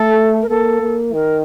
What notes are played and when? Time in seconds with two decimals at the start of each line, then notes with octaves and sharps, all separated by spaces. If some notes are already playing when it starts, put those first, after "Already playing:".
Already playing: A3 A4
0.42 A#4
0.49 A#3 A4
0.82 A#3
1.14 D#3 A#4